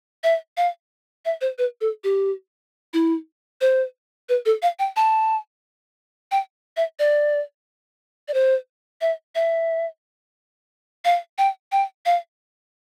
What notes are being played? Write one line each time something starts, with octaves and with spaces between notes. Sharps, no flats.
E5
F5
E5
C5
B4
A4
G4
E4
C5
B4
A4
F5
G5
A5
G5
E5
D5
D5
C5
E5
E5
F5
G5
G5
F5